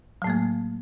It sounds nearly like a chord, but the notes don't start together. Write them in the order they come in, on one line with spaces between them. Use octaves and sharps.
F#3 A2 A#3 A3